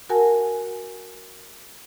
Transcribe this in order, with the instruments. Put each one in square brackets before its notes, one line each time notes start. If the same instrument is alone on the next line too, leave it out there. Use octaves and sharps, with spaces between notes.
[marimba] F#4 A#4 F#5 G#5 A5